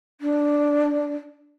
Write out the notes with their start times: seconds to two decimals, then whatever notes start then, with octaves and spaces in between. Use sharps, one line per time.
0.21 D4